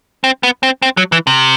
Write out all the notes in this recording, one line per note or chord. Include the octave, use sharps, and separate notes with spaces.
C4
B3
C4
C4
F#3
E3
C3